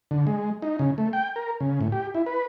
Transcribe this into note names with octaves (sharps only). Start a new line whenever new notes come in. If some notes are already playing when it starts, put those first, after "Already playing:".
D3
G#3
D#4
C#3
A3
G5
A#4
C#3
A2
G4
E4
B4